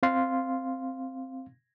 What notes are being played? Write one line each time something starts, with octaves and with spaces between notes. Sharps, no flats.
C4 F5 C6